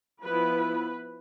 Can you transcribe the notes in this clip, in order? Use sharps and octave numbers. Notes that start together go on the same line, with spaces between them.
F3 B3 E4 B4 B5